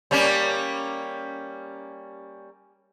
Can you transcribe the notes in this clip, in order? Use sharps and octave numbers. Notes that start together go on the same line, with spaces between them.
G3 A#3 C#4